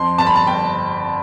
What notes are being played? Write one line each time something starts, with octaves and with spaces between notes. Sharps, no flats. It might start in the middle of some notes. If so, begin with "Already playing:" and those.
Already playing: F2 C6
G1 A5
B5
A5
G1 G5